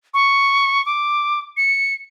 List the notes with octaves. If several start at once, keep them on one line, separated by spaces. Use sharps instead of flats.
C#6
D6
C#7